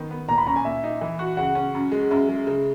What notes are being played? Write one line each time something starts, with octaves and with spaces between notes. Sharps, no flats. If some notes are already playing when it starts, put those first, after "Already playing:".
Already playing: D#3 B3
B3
A#2 A#5
B5
C#4 A#5
G#5
A#2 E5
D#4
E3
F#4
C#3 F#5
C#4
F#2
G#3
F#2 E5
G#3
C#3